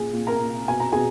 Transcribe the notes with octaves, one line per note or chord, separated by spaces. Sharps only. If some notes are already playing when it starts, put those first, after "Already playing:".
Already playing: A#2 G#4 G#5
A#2
A#4 A#5
A#2
B2 G#5
A#5
B2 G#4 G#5